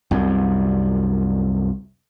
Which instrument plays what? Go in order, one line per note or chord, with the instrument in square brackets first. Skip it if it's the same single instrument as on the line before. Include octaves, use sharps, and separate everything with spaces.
[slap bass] C2 F#2